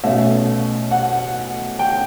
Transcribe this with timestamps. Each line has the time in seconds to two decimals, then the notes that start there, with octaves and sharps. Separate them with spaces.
0.04 B2 A3 C#4 E5
0.91 F#5
1.79 G5